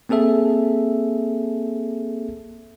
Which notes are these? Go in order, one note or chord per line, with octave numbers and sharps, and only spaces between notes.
A#3 C4 G#4 A4 E5